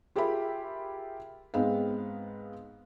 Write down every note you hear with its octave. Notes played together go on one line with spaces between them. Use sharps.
F4 G4 G#4 A#4 E5 B5
G#2 G#3 B3 C4 F5